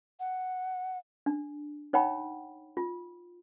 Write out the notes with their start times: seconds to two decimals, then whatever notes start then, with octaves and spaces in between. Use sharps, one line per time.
0.20 F#5
1.26 D4
1.93 D#4 C#5 F#5 G5 B5
2.77 F4